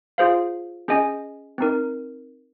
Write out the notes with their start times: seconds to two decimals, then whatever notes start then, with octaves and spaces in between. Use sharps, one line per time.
0.18 F4 G#4 C5 F5
0.88 C#4 G#4 D#5 G#5
1.58 C4 D#4 A#4